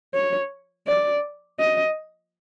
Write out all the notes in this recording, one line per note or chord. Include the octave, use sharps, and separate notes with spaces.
C#5
D5
D#5